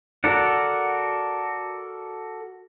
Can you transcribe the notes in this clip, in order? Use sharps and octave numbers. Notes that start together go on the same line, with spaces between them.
F#4 A4 A#4 D5 F#5